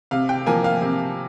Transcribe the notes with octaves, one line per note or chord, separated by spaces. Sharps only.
C3 F5
G5
F3 A#3 G#5
F5
C3